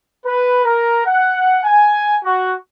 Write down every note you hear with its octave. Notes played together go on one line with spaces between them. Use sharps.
B4
A#4
F#5
G#5
F#4